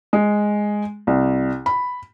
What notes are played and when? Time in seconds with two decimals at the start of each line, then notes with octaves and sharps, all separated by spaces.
0.13 G#3
1.07 C2
1.66 B5